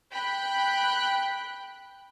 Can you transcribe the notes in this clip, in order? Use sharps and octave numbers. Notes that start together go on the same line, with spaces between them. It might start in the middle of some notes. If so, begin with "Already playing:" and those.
G5 B5 F#6